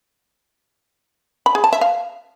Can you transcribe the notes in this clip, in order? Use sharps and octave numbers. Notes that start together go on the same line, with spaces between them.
B5
G#4
A5
E5
F5